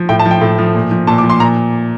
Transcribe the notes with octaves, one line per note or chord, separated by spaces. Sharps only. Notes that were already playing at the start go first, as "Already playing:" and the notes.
Already playing: F3
A2 G5
A5
F3
G5
A2
F3
A#2
F3
A#2 A5
D6
F3
C6
A#2 A#5